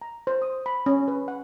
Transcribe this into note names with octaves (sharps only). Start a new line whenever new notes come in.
A#5
C5
D#6
B5
C#4
B4
F#5